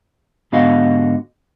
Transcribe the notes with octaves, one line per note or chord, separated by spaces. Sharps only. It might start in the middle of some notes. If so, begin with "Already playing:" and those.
G#2 D3 B3 F#4 D#5 F5